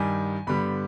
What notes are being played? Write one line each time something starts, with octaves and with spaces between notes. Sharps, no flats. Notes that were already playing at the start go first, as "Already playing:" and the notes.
Already playing: G2 D#3 G3 G#5
G2 D3 G3 B3 B5